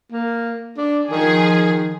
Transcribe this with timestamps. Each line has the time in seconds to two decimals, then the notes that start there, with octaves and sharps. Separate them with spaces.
0.12 A#3
0.77 D4
1.11 D#3 F3 G#4